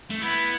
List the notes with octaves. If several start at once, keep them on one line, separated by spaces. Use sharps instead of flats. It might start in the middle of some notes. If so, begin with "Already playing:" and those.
A3
B3 E4